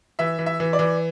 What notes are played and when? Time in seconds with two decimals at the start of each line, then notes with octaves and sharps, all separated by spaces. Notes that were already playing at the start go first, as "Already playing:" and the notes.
0.19 E3 E5
0.39 E3
0.46 E5
0.60 E3
0.73 D5
0.79 E3